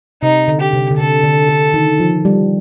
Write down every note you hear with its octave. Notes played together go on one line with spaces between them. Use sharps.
C3 D#4
D3
G4
C3
D3
C3 A4
D3
D3
D#3
F3
G3